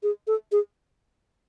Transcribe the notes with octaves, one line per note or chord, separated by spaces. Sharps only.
G#4
A4
G#4